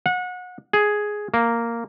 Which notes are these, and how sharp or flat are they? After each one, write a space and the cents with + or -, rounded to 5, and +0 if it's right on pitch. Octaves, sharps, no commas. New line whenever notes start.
F#5 -30
G#4 +5
A#3 -5